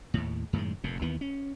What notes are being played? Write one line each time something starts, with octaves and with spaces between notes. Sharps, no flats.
D#2 A2
F#2 A2 D#3 G#3
F1 F2 A#2
D#2 D#3 E3 B3
C#4